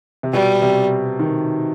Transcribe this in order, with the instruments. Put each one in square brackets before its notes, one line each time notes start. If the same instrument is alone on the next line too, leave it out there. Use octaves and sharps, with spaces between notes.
[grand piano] C3
[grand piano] B2 [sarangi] G3
[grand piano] C3
D#3